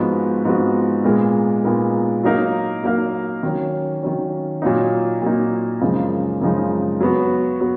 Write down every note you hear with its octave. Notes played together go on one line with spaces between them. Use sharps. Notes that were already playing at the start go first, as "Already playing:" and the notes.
Already playing: G#2 F3 B3 F#4
G#2 F3 B3 F#4
A#2 G#3 B3 D#4 A#4
A#2 G#3 B3 D#4 A#4
F#3 A#3 D#4 A#4 F5
F#3 A#3 D#4 A#4 F5
D#3 F#3 C#4
D#3 F#3 C#4
A#2 F#3 A#3 D#4
A#2 F#3 A#3 D#4
F#2 C#3 F3 G#3 D#4
F#2 C#3 F3 G#3 D#4
F#3 B3 F#4
F#3 B3 F#4